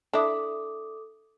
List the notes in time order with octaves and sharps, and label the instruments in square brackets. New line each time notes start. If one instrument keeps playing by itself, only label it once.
[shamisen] D4 E4 [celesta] A4 D6 D#6